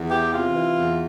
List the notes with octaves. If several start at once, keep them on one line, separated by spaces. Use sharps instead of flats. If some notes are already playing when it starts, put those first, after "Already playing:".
Already playing: E2
E3 G4
C3 F4
E3
E2